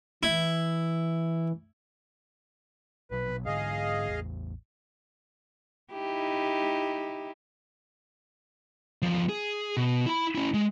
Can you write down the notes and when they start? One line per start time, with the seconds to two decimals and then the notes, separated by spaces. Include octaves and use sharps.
0.23 E3 E4
3.11 A#1 B2 F#3 B4
3.46 G#2 D3 G#4 D#5 F5
4.07 A1 E2
5.92 D#4 E4 G4
9.02 E2 F3
9.29 G#4
9.77 B2
10.06 E4 B5
10.35 C#4 E4
10.54 G#3